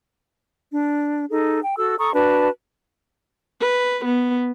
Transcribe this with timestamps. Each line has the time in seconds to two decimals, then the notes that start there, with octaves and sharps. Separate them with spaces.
0.74 D4
1.30 D#4 G#4 A4
1.62 G5
1.77 F#4 A4 E6
1.98 A4 A#5 C#6 D#6
2.13 D4 F#4 B4 A5
3.61 B4
4.05 B3